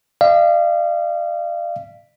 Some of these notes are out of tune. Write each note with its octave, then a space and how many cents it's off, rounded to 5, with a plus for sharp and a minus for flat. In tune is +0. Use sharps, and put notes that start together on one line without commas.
D5 +45 F5 -30